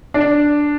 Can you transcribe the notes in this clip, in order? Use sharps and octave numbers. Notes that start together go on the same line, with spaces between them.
D4